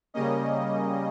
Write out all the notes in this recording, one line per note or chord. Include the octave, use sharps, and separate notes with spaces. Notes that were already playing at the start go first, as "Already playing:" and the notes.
C#3 G3 A#3 C#4 D#5